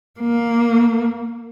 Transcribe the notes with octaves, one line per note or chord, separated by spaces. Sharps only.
A#3